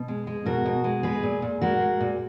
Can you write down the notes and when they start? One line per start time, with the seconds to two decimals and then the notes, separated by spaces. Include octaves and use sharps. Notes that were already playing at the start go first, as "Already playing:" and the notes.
Already playing: B2
0.08 G#3
0.27 G#3
0.46 B2 F#4 A#4
0.66 B2
0.84 G#3
1.03 G#3 G#4 B4
1.23 A#2
1.42 A#2
1.61 G#3 F#4 A#4
1.81 G#3
2.01 A#2